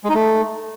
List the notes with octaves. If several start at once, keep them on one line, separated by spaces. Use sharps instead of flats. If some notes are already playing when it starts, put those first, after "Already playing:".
G#3
D#4
A3